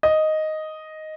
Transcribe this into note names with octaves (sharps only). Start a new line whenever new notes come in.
D#5